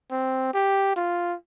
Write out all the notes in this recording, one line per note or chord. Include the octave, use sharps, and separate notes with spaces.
C4
G4
F4